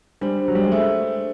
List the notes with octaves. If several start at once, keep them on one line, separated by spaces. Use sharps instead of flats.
G3 D4 G4 C5
F#3
G3
G#3
A3